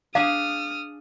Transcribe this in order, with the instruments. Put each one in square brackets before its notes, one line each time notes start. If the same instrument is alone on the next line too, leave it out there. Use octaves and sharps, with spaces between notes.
[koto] D4 G#4 [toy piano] F5 [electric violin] D#6 F6